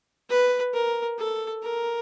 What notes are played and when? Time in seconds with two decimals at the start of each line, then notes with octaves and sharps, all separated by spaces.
0.30 B4
0.73 A#4
1.18 A4
1.62 A#4